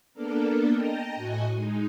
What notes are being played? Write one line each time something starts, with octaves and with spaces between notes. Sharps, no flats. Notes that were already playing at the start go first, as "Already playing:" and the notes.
A#3 B3 D4 A4 A#4
D#5 G5 A5 A#5
A2 F#4 D#5 G#5
G#3 D#4